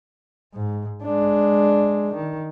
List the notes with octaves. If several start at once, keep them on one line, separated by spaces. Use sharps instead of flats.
G#2
G#3 D4
D#3